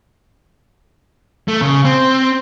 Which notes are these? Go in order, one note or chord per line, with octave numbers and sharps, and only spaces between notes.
A3
C#3
C4